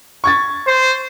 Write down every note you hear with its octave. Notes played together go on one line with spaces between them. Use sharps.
C#6 G#6 A6
C5